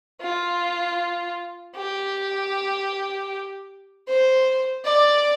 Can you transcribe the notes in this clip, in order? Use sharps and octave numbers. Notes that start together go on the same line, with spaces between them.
F4
G4
C5
D5